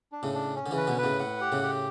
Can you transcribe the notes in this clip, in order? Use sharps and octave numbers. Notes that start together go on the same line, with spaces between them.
D4
A2 C#3
D4
C#4
D3
C#3 E3
B4
B2 D3
B4
A2 C#3
A2 F#5
G4
A2 C#3
G4